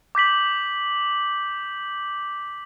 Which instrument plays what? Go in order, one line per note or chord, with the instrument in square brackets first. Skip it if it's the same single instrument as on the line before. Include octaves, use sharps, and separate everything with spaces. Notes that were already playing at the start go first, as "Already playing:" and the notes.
[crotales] D6 G6 B6 F#7